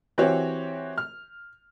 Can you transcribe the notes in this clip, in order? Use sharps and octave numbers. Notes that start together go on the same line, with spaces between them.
E3 C4 F#4 G4 C#5
F6